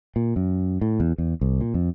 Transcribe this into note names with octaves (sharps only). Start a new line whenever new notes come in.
A#2
F#2
A2
E2
E2
C2
A#2
F2